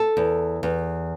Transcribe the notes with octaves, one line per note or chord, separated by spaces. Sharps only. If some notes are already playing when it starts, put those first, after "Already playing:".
Already playing: A4
E2
E2